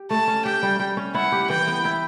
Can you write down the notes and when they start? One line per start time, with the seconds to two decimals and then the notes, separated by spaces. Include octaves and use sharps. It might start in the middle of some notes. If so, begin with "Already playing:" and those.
Already playing: G4
0.10 A3 A5
0.28 C#4
0.45 G4 G5
0.63 G3
0.79 G3
0.97 C#4
1.15 E4 F#5
1.32 G4
1.50 E3 G5
1.67 B3
1.85 E4